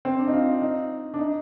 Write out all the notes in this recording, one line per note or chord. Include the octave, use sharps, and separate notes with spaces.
C4
D4
D#4
F4
D#4
D4
D#4